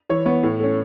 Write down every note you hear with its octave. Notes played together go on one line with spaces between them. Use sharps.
E3 C#5
B3 C#5
A2
A3 C#4